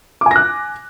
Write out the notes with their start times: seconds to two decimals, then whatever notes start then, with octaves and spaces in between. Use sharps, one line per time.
0.21 D6
0.26 G#5
0.31 A#6
0.36 F#6